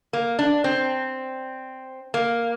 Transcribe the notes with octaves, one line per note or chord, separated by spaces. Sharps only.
A#3
D4
C4
A#3